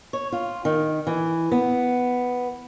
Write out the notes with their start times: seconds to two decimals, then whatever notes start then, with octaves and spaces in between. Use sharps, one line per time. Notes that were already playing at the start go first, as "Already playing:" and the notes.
0.13 C#5
0.32 F4
0.65 D#3
1.07 E3
1.52 B3